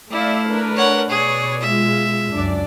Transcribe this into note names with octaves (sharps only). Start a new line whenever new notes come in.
A3 E4 D5 E5 F5
D4 A#4 B4
C#5 F#5
B2 G#4 B4 C#5 D5
G#3 F4 E5
C#2 F#2 D4 D5